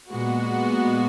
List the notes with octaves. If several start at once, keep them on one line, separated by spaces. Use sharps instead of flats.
A#2 G#3 B3 F#4